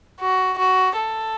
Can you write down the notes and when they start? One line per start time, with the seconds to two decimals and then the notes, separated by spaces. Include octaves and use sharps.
0.20 F#4
0.58 F#4
0.97 A4